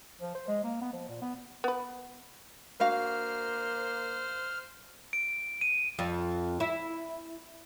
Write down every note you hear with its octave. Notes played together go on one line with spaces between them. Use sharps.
F3
C5
G#3
A#3
B3
F3
A#2
B3
B3 B4
A#3 D4 F#4 C5 F5 F6
D7
D#7
F2
E4